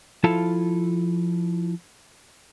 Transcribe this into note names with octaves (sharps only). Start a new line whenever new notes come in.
F3 E4 F4 A4 F5 A5